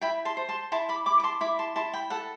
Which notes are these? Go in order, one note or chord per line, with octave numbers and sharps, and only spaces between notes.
E4 G5 B5
A5 C6
C5
A5 C6
E4 A5 C6
B5 D6
E4 B5 D6
D6
A5 C6
E4 B5 D6
A5 C6
E4 A5 C6
G5 B5
A4 F#5 A5